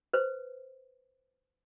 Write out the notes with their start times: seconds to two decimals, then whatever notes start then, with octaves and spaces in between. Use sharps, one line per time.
0.13 B4 C5